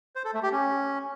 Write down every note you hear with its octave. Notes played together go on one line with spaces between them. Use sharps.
C5
A4
A3
G4
C#4